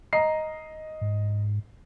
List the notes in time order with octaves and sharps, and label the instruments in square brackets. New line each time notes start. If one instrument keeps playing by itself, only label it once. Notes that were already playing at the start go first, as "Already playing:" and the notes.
[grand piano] D#5 A#5 C7
[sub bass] G#2